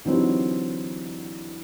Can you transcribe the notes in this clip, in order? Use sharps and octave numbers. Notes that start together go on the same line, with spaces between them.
D3 E3 F#3 C4 D#4 G4